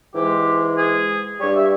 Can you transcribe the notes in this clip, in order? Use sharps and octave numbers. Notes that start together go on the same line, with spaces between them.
G#2 E3 G#3 G4
G#4
G2 G3 C#5
E5